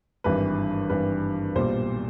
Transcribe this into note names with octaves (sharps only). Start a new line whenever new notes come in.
G#1 G2 E3 G3 B4
G#1 G2 E3 G3 B4
B1 A#2 G3 C5